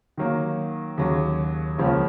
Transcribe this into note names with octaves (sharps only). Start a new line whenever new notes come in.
D#3 F#3 A#3
D#2 C#3 F#3
C#2 C#3 F3 A#3 C#4